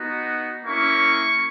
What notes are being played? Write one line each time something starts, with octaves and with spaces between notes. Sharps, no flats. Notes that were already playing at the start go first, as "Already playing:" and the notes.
Already playing: B3 D#4 F#4
A#3 C#4 E4 C#6